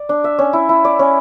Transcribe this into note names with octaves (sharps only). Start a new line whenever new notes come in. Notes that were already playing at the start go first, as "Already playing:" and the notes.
Already playing: D5
D4
E5
C#4
E4
E4
D5
C#4